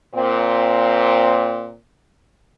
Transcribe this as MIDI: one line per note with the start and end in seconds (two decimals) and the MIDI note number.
0.15 1.73 46
0.15 1.73 60